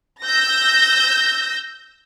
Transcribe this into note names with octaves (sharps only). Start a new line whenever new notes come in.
E6 G6 A#6